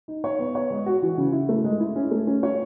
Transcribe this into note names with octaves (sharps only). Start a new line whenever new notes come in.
D#4
C#5
B3
C#5
G#3
F#4
E3
C#3
E4
A3
G#3
E4
C#4
A3
C#4
C#5